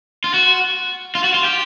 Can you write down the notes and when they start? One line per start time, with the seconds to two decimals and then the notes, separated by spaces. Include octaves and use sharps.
0.24 F4
0.34 F#4
1.15 F4
1.24 F#4
1.34 F4
1.44 G4